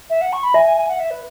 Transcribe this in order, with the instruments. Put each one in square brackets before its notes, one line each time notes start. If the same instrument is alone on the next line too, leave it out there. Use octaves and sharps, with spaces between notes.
[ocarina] E5
F#5
C#6
B5
[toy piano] E5 [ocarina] G#5
[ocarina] G#5
G#5
F#5
E5
B4